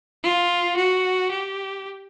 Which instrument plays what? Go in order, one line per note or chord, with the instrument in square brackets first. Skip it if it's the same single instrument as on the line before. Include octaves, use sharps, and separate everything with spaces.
[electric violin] F4
F#4
G4